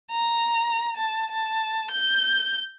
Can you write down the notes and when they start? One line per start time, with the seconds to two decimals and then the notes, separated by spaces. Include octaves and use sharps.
0.12 A#5
0.97 A5
1.31 A5
1.91 G6